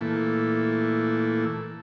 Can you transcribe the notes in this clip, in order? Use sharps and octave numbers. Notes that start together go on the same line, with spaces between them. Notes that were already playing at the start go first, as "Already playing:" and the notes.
A#2 E3 A3